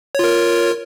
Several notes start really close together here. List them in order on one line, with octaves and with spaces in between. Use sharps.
C#5 F4 A#4